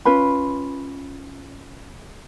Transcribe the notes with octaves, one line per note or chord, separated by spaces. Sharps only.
C#4 F4 B4 B5